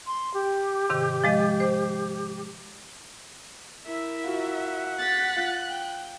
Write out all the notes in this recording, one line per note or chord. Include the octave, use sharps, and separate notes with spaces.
C6
G4
G#2 C3 D#3
F3 G#3 D#5
C5
E4 A#4 E5
F4 F#4 F#5
F#6 A6 B6
F4
G5